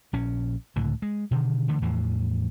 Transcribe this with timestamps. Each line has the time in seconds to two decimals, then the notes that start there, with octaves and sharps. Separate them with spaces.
0.13 A#1 C#4
0.76 C#2 A2 D3
1.02 G#3
1.31 B2 D3 D#3
1.68 D3 E3 A3
1.81 E2 A2 E3 F3